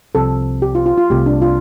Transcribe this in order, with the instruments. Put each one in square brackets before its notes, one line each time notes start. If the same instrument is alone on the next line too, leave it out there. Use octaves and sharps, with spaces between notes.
[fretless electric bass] C2 C3 F3 C4 [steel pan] A4
[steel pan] G4
F4
F4
F4
[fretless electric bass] C2 C3 A3 [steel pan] G4
[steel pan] D4
F4